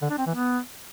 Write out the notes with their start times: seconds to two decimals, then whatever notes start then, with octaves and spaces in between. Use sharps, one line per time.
0.02 D3
0.10 D4
0.18 C4
0.26 E3
0.35 B3